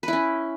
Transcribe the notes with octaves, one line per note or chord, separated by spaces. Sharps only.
C#4 E4 B4